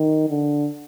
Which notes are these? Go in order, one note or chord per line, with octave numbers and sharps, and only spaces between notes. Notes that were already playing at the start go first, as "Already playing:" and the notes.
Already playing: D#3
D3